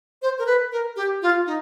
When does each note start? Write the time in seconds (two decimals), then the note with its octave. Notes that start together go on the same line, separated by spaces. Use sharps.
0.22 C5
0.39 A#4
0.46 B4
0.72 A#4
0.96 G4
1.22 F4
1.46 D#4